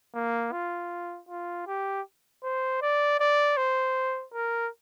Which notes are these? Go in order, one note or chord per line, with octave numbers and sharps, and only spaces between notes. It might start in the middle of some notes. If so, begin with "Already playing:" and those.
A#3
F4
F4
G4
C5
D5
D5
C5
A#4